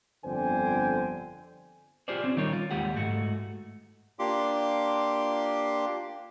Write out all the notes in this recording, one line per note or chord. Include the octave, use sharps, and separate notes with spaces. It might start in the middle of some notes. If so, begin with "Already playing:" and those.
G1 F2 D3 C5 G5 G#5
F4 G4 G#4 C5 D5
C4 C#4
D#3 G3 D#4 F4 A#4 C#5
F4
D#2 G#3 G4 F#5
G#2 A3 F#4
A#3 D4 F4 G4 C6 D6